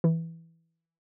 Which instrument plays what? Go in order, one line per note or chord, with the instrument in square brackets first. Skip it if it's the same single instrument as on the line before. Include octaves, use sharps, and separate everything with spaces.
[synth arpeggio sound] E3